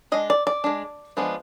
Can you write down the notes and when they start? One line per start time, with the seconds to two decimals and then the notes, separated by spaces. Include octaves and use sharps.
0.12 G#3 D4 D#5
0.30 D5
0.47 D5
0.64 G#3 D4
1.17 F3 G#3 B3 D4